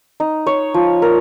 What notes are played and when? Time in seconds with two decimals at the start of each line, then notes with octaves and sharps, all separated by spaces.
0.20 D#4
0.46 C#5
0.74 F3
1.02 A#4